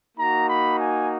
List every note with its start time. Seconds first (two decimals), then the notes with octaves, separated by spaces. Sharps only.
0.16 A#3 D#4 F#4 A#5
0.45 B5
0.75 G#5